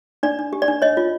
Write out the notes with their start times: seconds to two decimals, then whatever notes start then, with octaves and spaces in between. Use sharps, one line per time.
0.23 D4 D5
0.39 D4
0.53 G4
0.62 D5
0.68 D4
0.82 C#5 D#5
0.97 F4